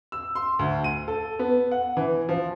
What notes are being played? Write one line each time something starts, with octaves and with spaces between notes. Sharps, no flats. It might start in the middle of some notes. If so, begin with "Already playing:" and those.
E6
C6
D2
D#7
A4
B3
F#5
E3
F3